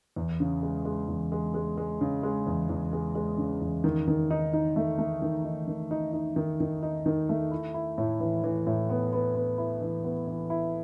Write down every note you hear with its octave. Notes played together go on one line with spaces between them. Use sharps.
E2
C#3
G#3
G#3
E2
G#3
G#3
G#3
C#3
G#3
E2
E2
G#3
G#3
C#3
E2
D#3
D#3
D#4
D#4
A3
A3
D#3
D#4
D#3
D#4
D#4
D#3
D#3
D#4
D#3
A3
E4
E4
A2
E3
E3
A2
B3
B3
B3
E4
E3
B3
E3
E4